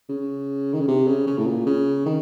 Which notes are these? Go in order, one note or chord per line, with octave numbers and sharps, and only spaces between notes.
C#3
D#3
C#3
C3
C#3
C#3
A2
A#2
C#3
D#3